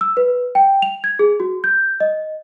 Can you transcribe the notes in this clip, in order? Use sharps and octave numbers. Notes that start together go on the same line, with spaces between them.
E6
B4
G5
F7
G#6
G#4
F#4
G6
D#5